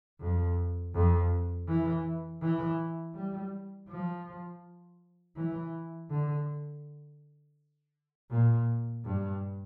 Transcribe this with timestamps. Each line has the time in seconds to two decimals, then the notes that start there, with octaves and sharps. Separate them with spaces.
0.20 F2
0.94 F2
1.68 E3
2.42 E3
3.15 G3
3.89 F3
5.36 E3
6.10 D3
8.31 A#2
9.05 G2